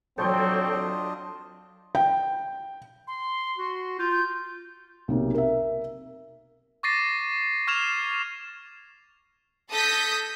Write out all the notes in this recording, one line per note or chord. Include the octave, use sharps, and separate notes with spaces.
F#3 C4 D4 F4 A4 C#5 D#5 G5
G5
C6
F#4
F4 G6
G6
B1 C3 A#3
A#4 E5
C#6 D6 A6 A#6 C7 D#7
C#6 F6 G#6 C7 E7 F7
A4 A5 D#6 G6 A#6 B6